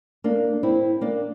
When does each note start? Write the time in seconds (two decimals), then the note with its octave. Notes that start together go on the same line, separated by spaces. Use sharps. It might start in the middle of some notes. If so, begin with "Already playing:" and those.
0.24 A#3 D4
0.63 C4 E4
1.01 A#3 D4